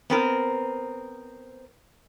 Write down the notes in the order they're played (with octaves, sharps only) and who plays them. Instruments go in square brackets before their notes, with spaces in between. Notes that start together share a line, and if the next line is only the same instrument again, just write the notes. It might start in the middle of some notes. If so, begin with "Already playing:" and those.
[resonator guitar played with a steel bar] B3 C4 A#4